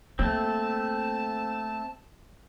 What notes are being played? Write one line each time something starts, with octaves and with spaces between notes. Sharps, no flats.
A3 A#3 C4 A5